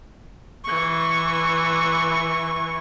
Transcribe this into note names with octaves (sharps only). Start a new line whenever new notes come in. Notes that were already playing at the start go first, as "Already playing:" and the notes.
E3 C#6